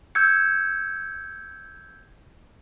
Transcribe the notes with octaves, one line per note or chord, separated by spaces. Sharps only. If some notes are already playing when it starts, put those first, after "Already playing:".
E6 G6 G#6 C#7